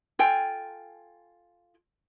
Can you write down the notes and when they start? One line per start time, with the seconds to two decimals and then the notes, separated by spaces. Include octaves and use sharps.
0.19 F4 A4 G5 G#5